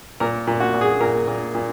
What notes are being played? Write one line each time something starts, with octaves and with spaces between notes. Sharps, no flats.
A#2 A#4
A#2
F#4
A#2
G#4
A#2 A#4
A#2
A#2